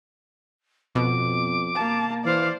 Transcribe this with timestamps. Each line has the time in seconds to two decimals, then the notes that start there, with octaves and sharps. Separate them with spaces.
0.95 F2 B2 D6
1.75 A#3 A5
2.25 E3 C5 D5 F5